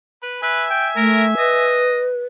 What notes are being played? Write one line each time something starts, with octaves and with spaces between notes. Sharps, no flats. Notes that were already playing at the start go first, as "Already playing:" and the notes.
B4
B4 E5 G#5
G5
A3 A#4
B4 D#5